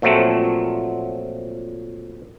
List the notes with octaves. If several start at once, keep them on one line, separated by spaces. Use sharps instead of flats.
A#2 F3 F#3 A3 C4